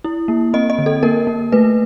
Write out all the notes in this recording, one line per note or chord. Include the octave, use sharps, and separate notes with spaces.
E4
A#3
C4 D#5
D#5
D3
A4
A#3 A#4
A#3
A3 B4